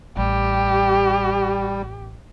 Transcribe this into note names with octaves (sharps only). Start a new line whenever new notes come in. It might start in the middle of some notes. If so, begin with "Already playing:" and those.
A1 G3 G4